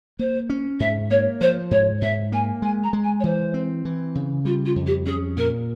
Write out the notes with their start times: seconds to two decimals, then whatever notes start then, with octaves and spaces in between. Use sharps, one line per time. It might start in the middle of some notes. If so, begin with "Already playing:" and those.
0.19 A#3 C5
0.50 C#4
0.80 G#2 E5
1.10 A#3 C#5
1.41 F3 C5
1.71 G#2 C#5
2.01 G#2 E5
2.32 A#3 G#5
2.62 G#3 G#5
2.83 A#5
2.93 G#3
3.03 G#5
3.20 C#5
3.24 E3 C5
3.54 C4
3.85 E3
4.15 C#3
4.45 G3 F4
4.65 F4
4.76 F2
4.86 G4
5.06 C#4 G#4
5.37 A#2 A#4